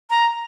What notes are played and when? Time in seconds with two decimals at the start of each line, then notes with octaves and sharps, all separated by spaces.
0.10 A#5